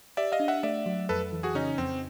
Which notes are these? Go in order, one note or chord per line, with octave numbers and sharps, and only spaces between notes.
G4 D5 E5
D#5 F5
D4
E5 F#5
A3 D5 E5
F#3
F2 A4 B4
E3
F#4 G#4
C#3 C#4 D#4
F2 C4